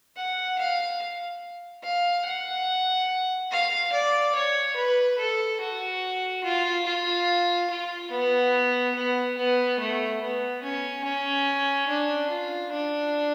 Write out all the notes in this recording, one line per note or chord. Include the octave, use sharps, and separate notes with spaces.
F#5
F5
F5
F#5
F5
D5
C#5
B4
A4
F#4
F4
F4
F4
B3
B3
B3
A3
B3
C#4
C#4
D4
F4
D4